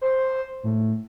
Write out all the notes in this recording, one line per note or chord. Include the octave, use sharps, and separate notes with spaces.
C5
A2